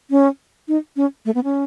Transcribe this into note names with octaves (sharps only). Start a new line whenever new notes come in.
C#4
D#4
C#4
A3
B3
C#4